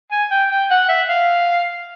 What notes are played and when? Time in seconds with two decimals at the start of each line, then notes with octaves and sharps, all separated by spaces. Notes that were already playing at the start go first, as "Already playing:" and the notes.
0.12 G#5
0.31 G5
0.51 G5
0.70 F#5
0.89 E5
1.09 F5